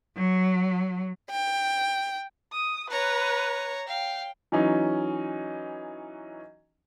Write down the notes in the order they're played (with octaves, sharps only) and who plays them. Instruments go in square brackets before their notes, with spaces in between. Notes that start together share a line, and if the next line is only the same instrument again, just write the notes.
[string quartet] F#3
[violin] G5
[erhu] D#6
[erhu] B4 [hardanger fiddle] C#5 A#5
[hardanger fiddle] F5 [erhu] G5
[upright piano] E3 F#3 C#4 D#4